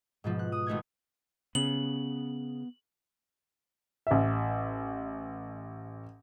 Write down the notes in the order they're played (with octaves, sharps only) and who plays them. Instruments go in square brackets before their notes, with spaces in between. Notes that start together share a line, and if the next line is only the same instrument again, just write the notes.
[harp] G#2 B2 F3
F#6
D#6
G#1 A3 D#4 G#6
[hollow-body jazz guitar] C#3 [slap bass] B3 [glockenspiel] F#7
[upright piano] A1 E5